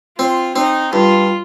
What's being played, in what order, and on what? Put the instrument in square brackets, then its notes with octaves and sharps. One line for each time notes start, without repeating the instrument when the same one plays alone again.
[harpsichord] C4 [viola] F4
[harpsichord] C4 [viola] D#4
[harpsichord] G2 [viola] F4